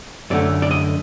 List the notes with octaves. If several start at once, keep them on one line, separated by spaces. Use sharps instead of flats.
F#2 D3 A3 D5
D5
D#5